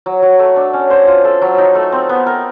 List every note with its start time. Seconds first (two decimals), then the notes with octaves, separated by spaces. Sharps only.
0.06 F#3
0.22 F#3
0.39 A3
0.56 D4
0.73 C#4
0.90 C5
1.07 F4
1.24 A4
1.42 F#3
1.58 D#4
1.75 A3
1.92 C4
2.09 B3
2.26 A#4